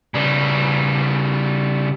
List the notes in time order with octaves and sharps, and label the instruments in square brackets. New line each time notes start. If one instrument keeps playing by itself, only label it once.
[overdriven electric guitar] C#3 G3